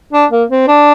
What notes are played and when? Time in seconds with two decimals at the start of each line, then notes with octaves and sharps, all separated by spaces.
0.13 D4
0.31 A#3
0.50 C4
0.68 D4